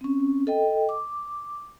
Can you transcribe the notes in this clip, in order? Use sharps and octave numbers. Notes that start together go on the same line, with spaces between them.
C4 C#4
A4 D#5 G5
D6